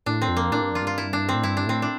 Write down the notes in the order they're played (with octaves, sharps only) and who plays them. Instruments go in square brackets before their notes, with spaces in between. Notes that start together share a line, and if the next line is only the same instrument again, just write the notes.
[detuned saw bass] A2 [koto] D4
[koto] C4
[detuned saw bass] F2
[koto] A#3
[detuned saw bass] A2 [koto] D4
[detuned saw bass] G2
[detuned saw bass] F2 [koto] F4
[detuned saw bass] G2
[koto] F4
E4
D4
C4
[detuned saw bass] A2
[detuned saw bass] G2 [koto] E4
[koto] D4
[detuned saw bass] A2 [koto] C4
[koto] D4